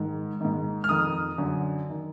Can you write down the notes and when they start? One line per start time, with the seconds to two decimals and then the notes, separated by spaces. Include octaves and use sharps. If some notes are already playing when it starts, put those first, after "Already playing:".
Already playing: G#2 D#3
0.41 G#2 D#3
0.84 F6
0.89 F2 D#3 D#6
1.38 F#2 D3
1.90 D#3